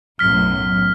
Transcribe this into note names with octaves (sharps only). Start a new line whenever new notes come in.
B1 F#2 A2 F6 B6